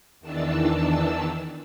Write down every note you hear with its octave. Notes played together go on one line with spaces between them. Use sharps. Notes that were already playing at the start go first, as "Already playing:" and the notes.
E2 D#3 E3 D4 A5 E6